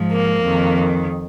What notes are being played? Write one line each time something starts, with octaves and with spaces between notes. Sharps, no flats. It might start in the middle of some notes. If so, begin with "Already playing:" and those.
Already playing: G#2 F3
A#3
F2 D#3